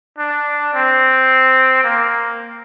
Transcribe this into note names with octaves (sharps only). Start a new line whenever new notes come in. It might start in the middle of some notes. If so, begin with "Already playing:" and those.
D4
C4
A#3